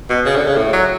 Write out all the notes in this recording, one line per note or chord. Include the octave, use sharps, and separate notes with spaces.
B2
C#3
D3
C#3
A2
F#3